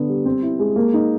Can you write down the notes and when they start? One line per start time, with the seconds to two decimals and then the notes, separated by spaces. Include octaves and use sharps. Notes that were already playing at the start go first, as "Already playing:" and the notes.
Already playing: D3 B3
0.08 G3
0.26 C4
0.43 E4
0.59 G#3
0.76 A#3
0.94 D#4